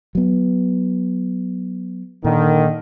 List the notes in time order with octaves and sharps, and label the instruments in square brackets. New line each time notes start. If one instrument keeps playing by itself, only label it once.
[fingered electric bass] F#3 B3
[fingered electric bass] A#2 [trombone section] D3 D#3